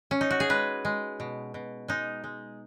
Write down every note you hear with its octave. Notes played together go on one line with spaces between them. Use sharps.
C#4
D#4
F#4
G#4
G#3 B4
G#3
B2
B2
G#3 D#4
G#3